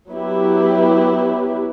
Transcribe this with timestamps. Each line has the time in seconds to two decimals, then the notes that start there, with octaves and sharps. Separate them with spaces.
0.10 F#3 B3 E4 G4 B4